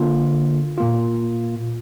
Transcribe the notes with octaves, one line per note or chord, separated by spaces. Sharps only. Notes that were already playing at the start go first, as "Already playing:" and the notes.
Already playing: D3 A#3 F4
A#2 A#3 F4